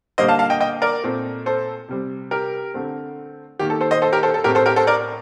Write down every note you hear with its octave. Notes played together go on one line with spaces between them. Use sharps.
D3 G3 A#3 C5 D#5
F5 A5
F5 A5
D#5 G5
D#5 G5
A#4 D5
A#2 A3 C4
A4 C5
C3 G3 C4
G4 A#4
D3 A3 C4
D#3 A#3 G4
A4
A4 C5
C5 D#5
A4 C5
G4 A#4
A4 C5
A4
A2 A3 C4 G4 A#4
A4 C5
G4 A#4
A4 C5
A#4 D5